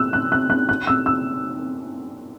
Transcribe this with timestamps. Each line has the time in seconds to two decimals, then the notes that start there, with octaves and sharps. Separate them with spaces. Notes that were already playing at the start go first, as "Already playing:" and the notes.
Already playing: E6 F#6
0.13 F#6
0.32 F#6
0.50 F#6
0.69 F#6
0.87 E6
1.06 E6